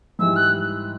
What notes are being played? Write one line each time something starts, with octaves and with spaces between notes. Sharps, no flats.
G#2 E3 G3 E6
F#6